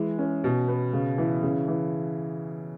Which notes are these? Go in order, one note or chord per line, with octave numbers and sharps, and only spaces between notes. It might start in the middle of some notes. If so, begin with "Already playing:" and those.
Already playing: E3 G#3
C#4
B2
B3
C#3
E3
C#3
E3